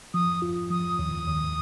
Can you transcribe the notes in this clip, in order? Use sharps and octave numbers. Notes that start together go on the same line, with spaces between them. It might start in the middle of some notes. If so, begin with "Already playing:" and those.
F3 D#6
F4
F3 D#6
D#2
D#2